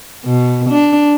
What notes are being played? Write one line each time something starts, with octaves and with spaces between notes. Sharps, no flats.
B2
D4